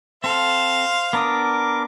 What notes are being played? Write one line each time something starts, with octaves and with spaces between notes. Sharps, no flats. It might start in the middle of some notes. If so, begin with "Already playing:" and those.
C4 A4 C5 F5
B3 D4 A#4 D6 D#6